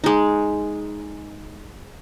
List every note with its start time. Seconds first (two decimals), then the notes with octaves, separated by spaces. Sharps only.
0.04 G#3 D#4